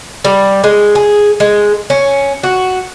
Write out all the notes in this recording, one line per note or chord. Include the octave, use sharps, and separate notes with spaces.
G3
G#3
G#4
G#3
C#4
F#4